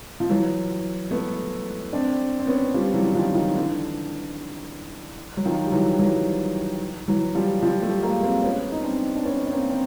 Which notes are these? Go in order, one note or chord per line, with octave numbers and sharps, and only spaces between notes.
F3
E3 F#3
A3 B3
C4 D4
C4
B3 C#4
F3 G3
E3 F#3
D#3 F3
D#3 F3
D3 E3
F#3
D#3 F3
G3
E3 F#3
E3 F#3
E3 F#3
F3 G3
F3 G3
G3 A3
G#3 A#3
A#3 C4
B3 C#4
D#4
C4 D4
D4
B3 C#4
C#4
A#3 C4
C4